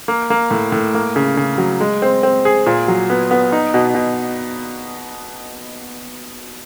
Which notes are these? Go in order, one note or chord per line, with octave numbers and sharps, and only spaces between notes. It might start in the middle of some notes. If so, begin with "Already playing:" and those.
A#3
A#3
A2
A2
A#3
C#3
C#3
F#3
G#3
C4
C4
G#4
A#2
F#3
B3
B3
D#4
B2
B2